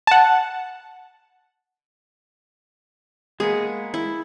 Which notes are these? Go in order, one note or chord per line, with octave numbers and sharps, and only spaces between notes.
F#5 A5
G#3 A#3 B3 G#4
E4